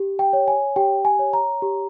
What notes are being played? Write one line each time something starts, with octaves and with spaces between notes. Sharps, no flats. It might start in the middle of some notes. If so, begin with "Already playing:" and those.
Already playing: G4
G5
C#5
G#5
G4 G5
G#5
C#5
A#5
G4